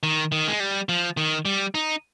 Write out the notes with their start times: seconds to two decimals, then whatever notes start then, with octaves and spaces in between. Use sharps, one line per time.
0.03 D#3
0.32 D#3
0.48 G#3
0.60 G3
0.89 F3
1.17 D#3
1.45 G3
1.75 D#4